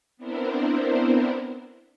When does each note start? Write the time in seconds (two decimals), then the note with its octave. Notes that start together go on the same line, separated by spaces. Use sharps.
0.17 B3 C4 D4 E4 A#4 C5